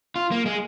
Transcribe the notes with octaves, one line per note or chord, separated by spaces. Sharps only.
F4
A#3
G#3